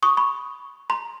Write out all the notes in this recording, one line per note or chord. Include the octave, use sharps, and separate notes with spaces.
C#6 D#6
B5 C#6
A#5 C6